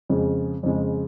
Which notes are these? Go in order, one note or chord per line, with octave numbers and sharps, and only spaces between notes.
F2 C#3 G#3
F2 C#3 G#3